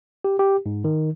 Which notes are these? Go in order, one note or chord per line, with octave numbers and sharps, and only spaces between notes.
G4
G4
G#2
D#3